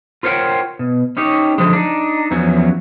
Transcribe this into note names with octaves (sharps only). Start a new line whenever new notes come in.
F4 A#4 C5 C#5 F#5 G5
B2
C#4 D#4 G4 C#5
D3 F3 G#3
D4 D#4
E2 F3 F#3 C#4